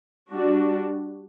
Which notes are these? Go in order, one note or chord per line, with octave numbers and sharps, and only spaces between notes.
G3 D4 F#4